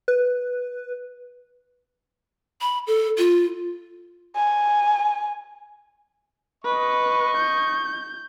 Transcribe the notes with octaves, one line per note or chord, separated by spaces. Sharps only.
B4
B5
A4
F4
G#5
B4 D#5 C#6
G6